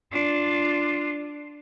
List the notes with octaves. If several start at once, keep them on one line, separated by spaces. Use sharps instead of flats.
D4 F4